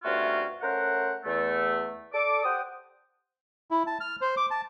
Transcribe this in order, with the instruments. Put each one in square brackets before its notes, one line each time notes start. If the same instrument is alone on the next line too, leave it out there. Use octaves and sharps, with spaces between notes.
[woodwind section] G2 C3 A3 C#4 F4 F#4
A3 C#4 A#4 C5 F#5
E2 A3
A4 D5 D6
G4 C5 F#5 G5 D#6
[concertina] E4
A5
F6
C5
D6
A5